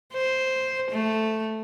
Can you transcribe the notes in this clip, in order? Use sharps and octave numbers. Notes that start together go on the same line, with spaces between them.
C5
A3